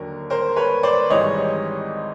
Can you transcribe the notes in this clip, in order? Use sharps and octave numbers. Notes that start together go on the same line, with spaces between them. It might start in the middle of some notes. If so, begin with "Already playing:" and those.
Already playing: D#2 D3 F#3 A#4
A#4 C5
B4 C#5
C5 D5
G#1 G#2 E3 G3 C#5 D#5